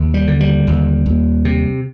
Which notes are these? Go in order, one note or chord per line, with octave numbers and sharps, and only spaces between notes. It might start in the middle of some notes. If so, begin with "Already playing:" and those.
Already playing: D#2 C3
G3
D3
G3
D#2
D#2
C3